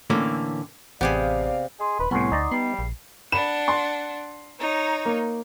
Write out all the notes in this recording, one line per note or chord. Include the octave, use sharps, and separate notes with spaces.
A2 D3 E3 A#3 C#4
A1 C3 B3 G4 G#4 D5 E5 F5
G#4 D#5 C6
D#1 B4
C2 A2 B3 C#4 F#5 C6 C7
D2 D#4 D5 D#5
G3 B3 C7
A#1
D4 F#5 B5 E7
C6
D#4 C#5
A#3